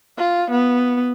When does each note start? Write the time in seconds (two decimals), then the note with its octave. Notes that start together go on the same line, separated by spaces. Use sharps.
0.18 F4
0.51 B3